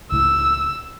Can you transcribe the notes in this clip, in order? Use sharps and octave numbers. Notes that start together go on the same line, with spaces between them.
C#2 A2 E6